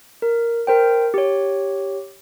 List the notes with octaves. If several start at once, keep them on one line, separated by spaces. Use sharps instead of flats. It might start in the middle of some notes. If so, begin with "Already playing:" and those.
A#4
A#4 C5 G5
G4 C#5